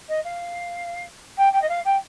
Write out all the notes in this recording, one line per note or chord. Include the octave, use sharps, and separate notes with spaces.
D#5
F5
G5
G5
D#5
F5
G5